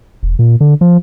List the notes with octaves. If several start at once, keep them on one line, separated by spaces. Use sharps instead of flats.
E1
A#2
D3
F3